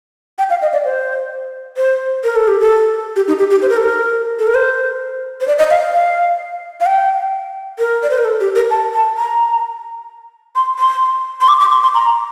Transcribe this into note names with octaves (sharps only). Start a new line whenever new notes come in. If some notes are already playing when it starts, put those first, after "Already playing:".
G5
F5
D#5
D5
C5
C5
A#4
A4
G4
A4
G4
D#4
G4
G4
C5
A#4
A4
A#4
A4
A#4
C5
C5
D5
D#5
F5
F5
F5
G5
A#4
D5
C5
A#4
A4
G4
A#4
A5
A5
A#5
C6
C6
C6
D6
D6
C6
C6
A#5